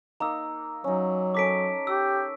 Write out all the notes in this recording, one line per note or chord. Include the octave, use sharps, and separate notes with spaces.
A#3 D#4 A#5 E6
F#3 C#4 D#4
C#4 A4 A#4 D6 B6 D7
G4 E6